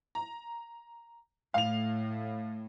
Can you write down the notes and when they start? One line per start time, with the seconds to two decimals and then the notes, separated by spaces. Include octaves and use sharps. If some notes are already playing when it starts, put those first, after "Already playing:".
0.15 A#5
1.54 A2 F5 F7